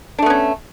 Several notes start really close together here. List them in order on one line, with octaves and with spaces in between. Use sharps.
D4 A3 B3 C#4